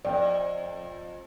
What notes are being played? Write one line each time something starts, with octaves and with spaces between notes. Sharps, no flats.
F2 D5 G5